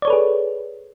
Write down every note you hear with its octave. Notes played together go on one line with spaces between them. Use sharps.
G#4 A4 B4 C#5 D5